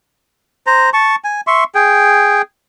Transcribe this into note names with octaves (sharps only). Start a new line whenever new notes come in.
C5 A#5
A5 C#6
G#5
E5 C6 C#6
G#4 G5